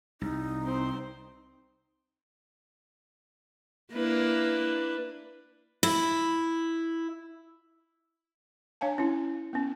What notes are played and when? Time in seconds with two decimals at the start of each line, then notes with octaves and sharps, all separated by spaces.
0.21 C2 D#4
0.63 C4 C5
3.94 A#3 D4 E4 B4
5.83 E4
8.81 D4 C#5 F5 G#5 A5
8.98 C#4 E4
9.53 B3 C#4